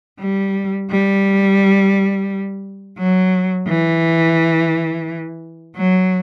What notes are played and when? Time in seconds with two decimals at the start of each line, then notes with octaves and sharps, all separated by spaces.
0.20 G3
0.90 G3
2.98 F#3
3.68 E3
5.76 F#3